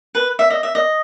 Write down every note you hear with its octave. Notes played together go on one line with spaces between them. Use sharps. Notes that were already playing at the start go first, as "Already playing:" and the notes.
B4
E5
D#5
E5
D#5